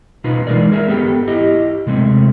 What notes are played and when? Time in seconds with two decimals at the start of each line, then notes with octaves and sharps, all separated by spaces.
0.24 B2 D#4 F4 B4
0.47 E3 G#3 D#4 A#4 D5
0.72 G#4 A#4 E5
0.88 B3 G4 A4 D#5 G5
1.27 E4 G4 D#5
1.87 C3 G#3 A3 C4